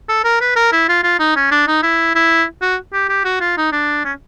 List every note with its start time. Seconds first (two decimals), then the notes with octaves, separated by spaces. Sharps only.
0.09 A4
0.24 A#4
0.41 B4
0.56 A#4
0.72 E4
0.89 F4
1.03 F4
1.19 D#4
1.36 C#4
1.51 D4
1.67 D#4
1.83 E4
2.15 E4
2.62 F#4
2.93 G4
3.09 G4
3.24 F#4
3.40 F4
3.57 D#4
3.72 D4
4.05 C#4